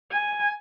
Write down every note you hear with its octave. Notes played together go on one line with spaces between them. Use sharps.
G#5